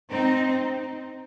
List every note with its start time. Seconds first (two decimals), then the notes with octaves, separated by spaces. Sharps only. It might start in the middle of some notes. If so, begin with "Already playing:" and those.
0.10 C4 D#4